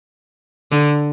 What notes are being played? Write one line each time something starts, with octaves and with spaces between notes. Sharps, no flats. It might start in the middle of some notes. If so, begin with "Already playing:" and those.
D3